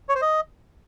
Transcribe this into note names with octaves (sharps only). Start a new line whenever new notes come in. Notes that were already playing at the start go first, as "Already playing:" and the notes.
C#5
C5
D#5